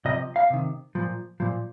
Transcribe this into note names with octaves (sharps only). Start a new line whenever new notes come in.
C3 F3 D#5
F5
C3 D#3
A#2 F3
A#2 F3